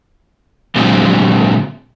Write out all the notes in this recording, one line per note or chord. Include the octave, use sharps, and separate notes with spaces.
A#2 D3 F#3 G#3 C4